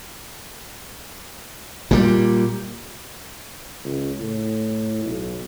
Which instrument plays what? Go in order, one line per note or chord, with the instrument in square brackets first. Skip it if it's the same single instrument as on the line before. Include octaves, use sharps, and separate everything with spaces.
[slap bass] A#2 G3
[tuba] C#2
A2
B1